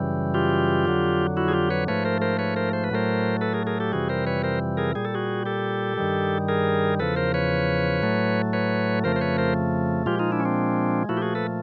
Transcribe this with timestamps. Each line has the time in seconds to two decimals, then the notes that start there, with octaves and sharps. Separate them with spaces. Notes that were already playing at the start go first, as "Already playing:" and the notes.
Already playing: F#2 C#3 E3 G3
0.34 F4 G4
0.85 F2 D3 F#3
1.37 E4 F#4
1.48 G#4
1.53 F4 G4
1.70 B4 C#5
1.88 G#2 F3 A3 B4 C#5
2.05 A#4 C5
2.22 A#4 C5
2.39 B4 C#5
2.56 A#4 C5
2.73 C5
2.84 B4
2.90 A2 F#3 A3 A#4 C5
3.41 A4 B4
3.54 G#4 A#4
3.67 G#4 A#4
3.80 G4 A4
3.92 F2 C3 E3 G3 F#4 G#4
4.09 A#4 C5
4.27 B4 C#5
4.44 A#4 C5
4.77 G#4 A#4
4.95 A#2 G3 G#4
5.05 A4
5.15 F#4 G#4
5.46 G4 A4
5.98 G2 D#3 G3
6.48 G#4 A#4
7.00 E2 C#3 F3 A4 B4
7.16 A#4 C5
7.34 B4 C#5
8.02 A2 F#3 A3
8.53 B4 C#5
9.04 F2 C#3 F3 A3 A#4 C5
9.16 C5
9.21 B4 C#5
9.38 A#4 C5
10.06 A#2 F3 G#3 F4 G4
10.19 D#4 F4
10.32 D4 E4
10.40 C#4
10.45 C4 D4
11.09 A#2 F3 A3 E4 F#4
11.17 G4
11.22 F#4 G#4
11.35 A4 B4